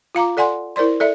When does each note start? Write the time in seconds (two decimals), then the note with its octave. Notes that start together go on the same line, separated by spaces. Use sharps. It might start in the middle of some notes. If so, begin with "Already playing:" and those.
0.15 F4 F5 A#5 D6
0.37 A4 D5 F#5 G#5 C6
0.76 E4 A#4 C5 D5 C6
1.00 A4 D5 E5